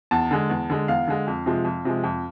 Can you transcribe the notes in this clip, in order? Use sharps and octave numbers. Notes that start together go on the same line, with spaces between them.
E2 A5
D3 G#3
E2
D3 G#3
E2 F5
D3 G#3
F2
C3 F3 G#3
F2
C3 F3 G#3
F2